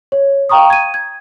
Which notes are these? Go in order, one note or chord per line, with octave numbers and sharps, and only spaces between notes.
C#5
F5 G5 A#5 C#6 D#6
G#6 D#7
G#6